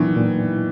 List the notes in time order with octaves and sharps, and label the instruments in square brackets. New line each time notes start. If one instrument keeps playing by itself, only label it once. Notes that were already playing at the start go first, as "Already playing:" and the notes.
Already playing: [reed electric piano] A#2 F#3 B3 D4 [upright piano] D#3 E3
[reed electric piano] A#2